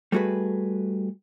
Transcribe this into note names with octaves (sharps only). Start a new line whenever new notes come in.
G3 A3 F#4 G#4 B4